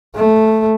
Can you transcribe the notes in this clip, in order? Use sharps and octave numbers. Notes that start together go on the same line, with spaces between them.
A3